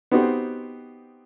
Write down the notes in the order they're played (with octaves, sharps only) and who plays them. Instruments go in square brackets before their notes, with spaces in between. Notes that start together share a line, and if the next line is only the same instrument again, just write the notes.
[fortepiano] B3 C4 D#4 F#4 G4 C5